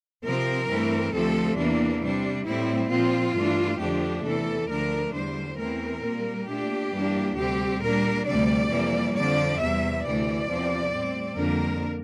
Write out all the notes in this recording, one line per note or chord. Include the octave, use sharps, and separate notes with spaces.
C3 F3 C4 A#4
G2 E3 A3 C4
D2 C3 F3 A3 A4
E2 E3 A#3 D4
C3 G3 D4
A2 G3 C4 E4
A#2 F3 C4 F4
G2 E3 A3 D4
F2 D3 F3 A3 D4 G4
E2 C3 E3 A3 A4
D2 D3 F3 A3 D4 A#4
E2 D3 G3 C5
E2 E3 A3 C4 A#4
A#2 G3 A#3
A#2 A3 D4 G4
G2 E3 A#3 D4
D2 C3 G3 C4 G4
A#2 G3 D4 A#4
D2 C3 G3 D5
F2 C3 E3 G3 A#3
F2 D3 F3 D5
E2 C3 G3 E5
D2 C3 E3 D5
E2 C3 F3 C4
A2 G3 C4
F2 D3 G3 A#3 D4 A#4